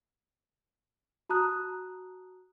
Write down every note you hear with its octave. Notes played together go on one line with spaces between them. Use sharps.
F#4 A5 A#5 D#6 F#6